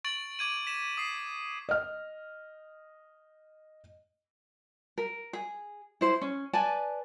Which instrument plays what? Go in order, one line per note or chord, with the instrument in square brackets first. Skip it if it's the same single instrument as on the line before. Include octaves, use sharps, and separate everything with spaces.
[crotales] C#6 A6 D7 F#7
D6 G#6 D#7
B6 E7
D#6 C7
[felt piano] D#5 F6
[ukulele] A#4
G#4
E4 C5
C#4
B4 D5 G#5 A5